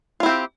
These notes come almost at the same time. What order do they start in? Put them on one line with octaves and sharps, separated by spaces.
F4 E4 C4 G4